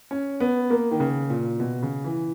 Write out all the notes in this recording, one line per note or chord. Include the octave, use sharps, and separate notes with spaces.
C#4
B3
A#3
D#3
C#3
A#2
B2
C#3
E3